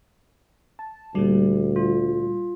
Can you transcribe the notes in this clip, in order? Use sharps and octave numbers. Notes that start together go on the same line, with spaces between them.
A5
D2 A#2 G3 G4
F4